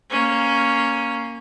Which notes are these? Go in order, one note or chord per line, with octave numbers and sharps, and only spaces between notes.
A#3 C#4